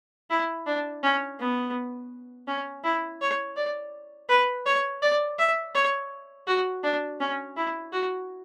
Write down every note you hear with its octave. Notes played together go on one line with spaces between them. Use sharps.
E4
D4
C#4
B3
C#4
E4
C#5
D5
B4
C#5
D5
E5
C#5
F#4
D4
C#4
E4
F#4